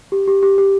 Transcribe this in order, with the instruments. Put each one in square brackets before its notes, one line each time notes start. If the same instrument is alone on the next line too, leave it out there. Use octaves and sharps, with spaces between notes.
[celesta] G4
G4
G4
G4